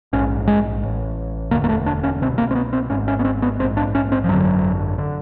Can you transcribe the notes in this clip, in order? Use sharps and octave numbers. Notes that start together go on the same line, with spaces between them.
A#1 G#2 C#4
G#3
A1 A2
E1 D2 D3 A#3
A#3
A3
D4
C#4
C2 B2 C4
A#3
C4
B3
C4
G#1 G#2 C#4
C#4
B3
C4
B3
A#1 G#2 C4
D4
C#4
C4
F3
G#1 F#2 D3 F#3
D3